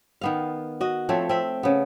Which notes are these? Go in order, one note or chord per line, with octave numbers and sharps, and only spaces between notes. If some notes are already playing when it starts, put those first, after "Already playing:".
D#3 B3 F5
F#4 D#5
F3 A3 C4 C#5
C4 E5
C#3 B3